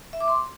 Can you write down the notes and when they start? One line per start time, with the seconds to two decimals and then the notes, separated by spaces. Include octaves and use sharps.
0.13 E5
0.20 D6
0.28 C6